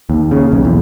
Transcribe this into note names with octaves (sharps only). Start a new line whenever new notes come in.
D#2
C#3
B1
E2